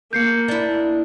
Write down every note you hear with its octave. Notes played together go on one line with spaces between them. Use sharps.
A#3 G6 C7 C#7
D4 E4